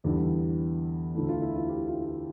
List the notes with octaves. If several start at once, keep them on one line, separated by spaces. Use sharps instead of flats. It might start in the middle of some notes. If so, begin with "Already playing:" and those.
E2 D3 G3 E4 G4
D2 D3 A3 E4
F4
E4
F4
E4 G4
F4
F4